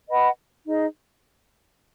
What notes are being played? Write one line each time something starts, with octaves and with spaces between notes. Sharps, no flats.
B4 D#5 F#5 B5
D#4 G#4 D#5